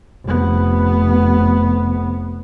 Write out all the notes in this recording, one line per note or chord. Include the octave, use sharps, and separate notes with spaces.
F1 B3